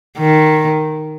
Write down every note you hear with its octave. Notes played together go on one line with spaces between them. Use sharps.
D#3